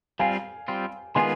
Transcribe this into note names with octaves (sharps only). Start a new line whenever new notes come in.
G3 C4 F4 F5 G#5
G3 C4 F4
D#3 G#3 B3 F4 G#4 G#5 C6